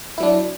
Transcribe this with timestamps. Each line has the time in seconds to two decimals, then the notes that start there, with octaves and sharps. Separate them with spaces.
0.18 E4
0.20 F#3
0.23 D4